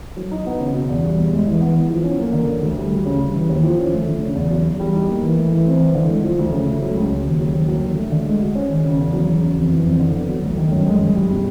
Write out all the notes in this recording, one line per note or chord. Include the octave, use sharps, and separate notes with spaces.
F#3
D#4
B3
C#3
B2
E2
G3
E2
G#3
E3
B3
E3
F3
C#4
A#3
D3
D3
D2
G3
D2
C#3
G3
E3
D#2
F3
C#4
A3
D3
C#3
E2
F#3
E2
G3
D#4
A#3
E3
A3
E3
C4
E3
D3
G#3
F3
D2
C#3
A3
F#3
C#2
C#3
D#2
F#3
D#2
F#3
D3
A3
D3
G#3
F#4
C#4
D#3
C#3
E2
F#3
E2
C#3
F2
E3
F2
D3
B3
F#3
D2
D#3
F#2
G#3
F#2
G3
B2